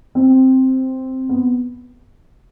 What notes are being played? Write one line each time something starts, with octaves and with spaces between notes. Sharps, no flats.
C4
B3